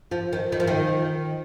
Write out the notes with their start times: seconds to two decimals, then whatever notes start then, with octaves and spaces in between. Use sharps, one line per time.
0.11 F3
0.33 D#3
0.52 D#3
0.60 F3
0.67 D#3